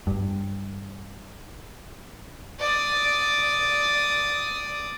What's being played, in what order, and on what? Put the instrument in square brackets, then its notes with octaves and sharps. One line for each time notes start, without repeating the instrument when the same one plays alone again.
[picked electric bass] G2
[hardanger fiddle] D5 D#6